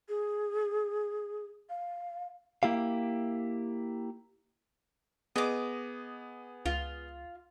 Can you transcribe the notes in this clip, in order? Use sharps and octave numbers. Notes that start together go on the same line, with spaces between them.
G#4
F5
A#3 E4 G4 F5
B3 G#4 D#5 D6
C#2 F4